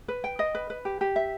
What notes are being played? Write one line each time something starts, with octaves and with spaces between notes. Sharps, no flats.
B4
G5
D#5
B4
B4
G4
G4
E5